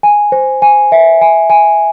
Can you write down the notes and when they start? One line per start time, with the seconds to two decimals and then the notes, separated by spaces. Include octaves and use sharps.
0.03 G#5
0.32 C5
0.62 G#5
0.92 E5
1.21 G#5
1.50 G#5